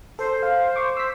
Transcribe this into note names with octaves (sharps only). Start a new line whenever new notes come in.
A4 C5
F5
C#6 D6
E6 B6